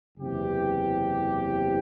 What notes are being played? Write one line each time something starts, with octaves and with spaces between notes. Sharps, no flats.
F#1 E2 C3 E3 G4